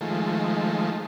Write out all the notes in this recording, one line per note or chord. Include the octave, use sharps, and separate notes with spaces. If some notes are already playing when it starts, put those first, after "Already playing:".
D#3 F3 G#3 A3